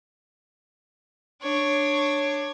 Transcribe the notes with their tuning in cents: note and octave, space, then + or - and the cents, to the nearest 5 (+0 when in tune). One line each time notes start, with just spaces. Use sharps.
D4 +10 C#5 +0